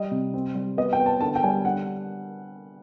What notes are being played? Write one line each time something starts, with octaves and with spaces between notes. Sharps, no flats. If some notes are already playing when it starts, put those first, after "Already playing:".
Already playing: G3 D#5
C3
C4
G3
B3 D#5
G5
B3
A5
D3 A5
G5
G3 G#5
D3 F#5